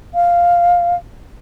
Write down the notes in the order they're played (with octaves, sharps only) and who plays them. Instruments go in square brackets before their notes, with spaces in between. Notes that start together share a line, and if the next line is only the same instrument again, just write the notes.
[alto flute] F5